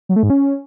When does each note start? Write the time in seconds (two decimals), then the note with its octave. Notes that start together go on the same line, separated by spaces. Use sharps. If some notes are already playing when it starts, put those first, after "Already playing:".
0.09 F#3
0.16 A3
0.23 G#2
0.30 C#4